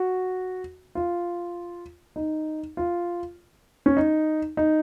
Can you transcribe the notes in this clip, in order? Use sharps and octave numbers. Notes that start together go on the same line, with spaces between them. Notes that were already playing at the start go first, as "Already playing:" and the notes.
Already playing: F#4
F4
D#4
F4
C#4
D#4
D#4